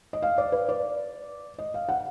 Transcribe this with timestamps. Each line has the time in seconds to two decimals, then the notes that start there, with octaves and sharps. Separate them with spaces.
0.13 D#5
0.22 F5
0.38 D5
0.52 B4
0.69 D5
1.58 D#5
1.74 F5
1.89 F#5